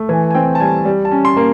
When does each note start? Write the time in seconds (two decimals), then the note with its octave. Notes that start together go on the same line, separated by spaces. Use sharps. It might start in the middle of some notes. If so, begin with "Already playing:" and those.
Already playing: A3
0.09 E3 G#5
0.31 G#5
0.34 C4 G5
0.55 A5
0.60 G3 G#5
0.85 G3
1.05 A5
1.11 C#4
1.25 C6
1.37 A#3